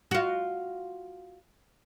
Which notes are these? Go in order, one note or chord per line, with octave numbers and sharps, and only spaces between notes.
F4 F#4